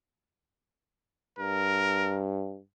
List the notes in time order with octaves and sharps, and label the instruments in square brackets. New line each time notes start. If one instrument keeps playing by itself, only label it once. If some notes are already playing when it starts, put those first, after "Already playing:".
[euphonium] G2 [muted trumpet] A#4